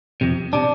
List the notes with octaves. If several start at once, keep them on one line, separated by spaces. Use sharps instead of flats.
F2 C3
C3 D4